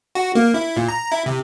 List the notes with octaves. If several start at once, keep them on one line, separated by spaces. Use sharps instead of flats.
F#4
A#3
E4
A#2
A#5
E4
C3